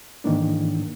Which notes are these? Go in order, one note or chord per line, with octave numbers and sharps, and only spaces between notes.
G#2 D#3 E3 A#3 D4